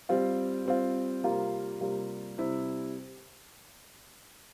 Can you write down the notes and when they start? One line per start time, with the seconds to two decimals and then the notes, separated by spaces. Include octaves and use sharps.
0.09 G3 C4 F4
0.66 G3 C4 F4
1.24 C3 G3 A#3 F4
1.81 C3 G3 A#3 F4
2.38 C3 G3 C4 E4